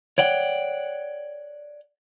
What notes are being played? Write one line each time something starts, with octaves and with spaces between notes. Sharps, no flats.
C#5 D5 F#5 G5